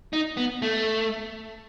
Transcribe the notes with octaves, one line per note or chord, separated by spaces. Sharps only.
D#4
B3
A3